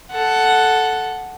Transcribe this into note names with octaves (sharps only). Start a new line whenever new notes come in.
A4 F#5